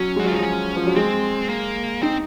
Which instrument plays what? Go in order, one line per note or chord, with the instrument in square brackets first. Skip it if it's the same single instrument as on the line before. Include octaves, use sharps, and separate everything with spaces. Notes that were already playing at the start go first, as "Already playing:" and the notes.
Already playing: [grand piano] F#3 [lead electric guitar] C#4
[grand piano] G#3
[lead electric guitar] F#4
[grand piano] F#3
[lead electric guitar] F4
[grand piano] F3
[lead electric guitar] D#4
[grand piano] F#3 [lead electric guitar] C#4
[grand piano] F3
F#3
[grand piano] G#3 [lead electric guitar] C4
[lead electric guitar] A#3
[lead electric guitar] C4 [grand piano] D#4